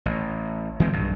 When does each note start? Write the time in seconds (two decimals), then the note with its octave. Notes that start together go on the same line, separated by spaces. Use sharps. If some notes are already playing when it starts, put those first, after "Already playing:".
0.06 A1
0.80 E3 G#3 C4
0.93 B1 G2